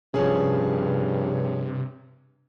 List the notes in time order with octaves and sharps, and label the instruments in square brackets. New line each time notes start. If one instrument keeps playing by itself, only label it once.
[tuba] G2 [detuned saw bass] C3 [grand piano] F3 C#4 G#4